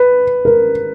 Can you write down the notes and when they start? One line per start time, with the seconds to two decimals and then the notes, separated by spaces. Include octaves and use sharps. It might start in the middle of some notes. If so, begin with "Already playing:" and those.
Already playing: B4
0.45 A#4